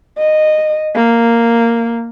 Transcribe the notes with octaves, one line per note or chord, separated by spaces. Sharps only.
D#5
A#3